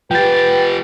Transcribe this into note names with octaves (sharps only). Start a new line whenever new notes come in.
F3 G4 B4 G5 A6